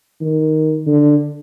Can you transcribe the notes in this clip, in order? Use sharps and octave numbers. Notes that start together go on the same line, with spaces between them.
D#3
D3